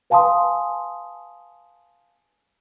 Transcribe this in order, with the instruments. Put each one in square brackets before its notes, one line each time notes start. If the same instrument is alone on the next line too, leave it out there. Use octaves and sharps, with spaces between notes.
[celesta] B4 F5 G#5 A5 C6 D#6